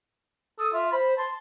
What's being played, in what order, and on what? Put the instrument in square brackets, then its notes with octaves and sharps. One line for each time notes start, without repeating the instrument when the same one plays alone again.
[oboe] A4 [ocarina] D#6
[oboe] F4 [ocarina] E5
[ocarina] C5 [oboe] B5
[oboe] A5 [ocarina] C6